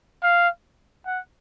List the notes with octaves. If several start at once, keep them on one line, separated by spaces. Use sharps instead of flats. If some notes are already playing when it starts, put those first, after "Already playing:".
F5
F#5